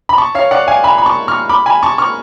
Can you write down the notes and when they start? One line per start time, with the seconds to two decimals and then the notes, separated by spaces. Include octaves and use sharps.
0.09 B5
0.18 A5 C#6
0.35 C#5 F5
0.51 D5 F#5
0.67 F5 G#5
0.84 G#5 B5
0.98 B5
1.06 A5 C#6
1.28 C#6 F6
1.49 B5 D6
1.66 G#5 B5
1.83 A5 C#6
1.98 C#6 F6